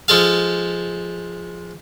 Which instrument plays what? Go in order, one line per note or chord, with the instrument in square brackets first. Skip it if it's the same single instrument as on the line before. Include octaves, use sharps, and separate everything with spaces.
[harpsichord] F3 G#3 A4 F5